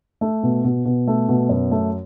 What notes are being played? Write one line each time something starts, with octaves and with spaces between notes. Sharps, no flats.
A3
B2
B2
B2
A3
B2
F#2
A3